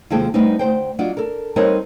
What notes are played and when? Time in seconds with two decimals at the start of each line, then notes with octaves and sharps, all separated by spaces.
0.10 D#2 C3 F3 G#3 A4 G5
0.34 G3 A3 B3 C4 D4 D#4
0.59 D2 A#2 C5 G5
0.99 F#3 D4 F4 F#4 D#5
1.17 A4 A#4
1.56 G3 C4 D#4 A#4 C#5 D#5